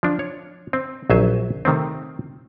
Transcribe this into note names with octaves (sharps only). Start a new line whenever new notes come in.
F3 D4
C#5
C4
A#1 F#3 C5 E5 G#5
C3 D#3 A3 C4